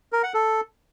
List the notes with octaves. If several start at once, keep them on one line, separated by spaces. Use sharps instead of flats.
A#4
F#5
A4